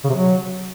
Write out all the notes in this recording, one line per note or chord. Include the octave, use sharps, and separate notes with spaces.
C#3
C3
F#3